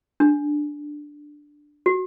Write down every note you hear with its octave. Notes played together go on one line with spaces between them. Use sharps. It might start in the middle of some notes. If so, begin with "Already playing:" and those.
D4
F#4